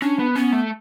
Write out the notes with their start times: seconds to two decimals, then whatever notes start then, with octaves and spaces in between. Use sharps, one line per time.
0.02 C#4 D4
0.19 B3
0.36 B3 C#4
0.52 A3